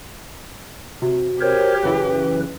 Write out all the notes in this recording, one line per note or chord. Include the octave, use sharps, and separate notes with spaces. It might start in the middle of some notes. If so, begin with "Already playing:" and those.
C3 F#4
G4 A#4 C5 C#5
F#2 C#3 E3 B4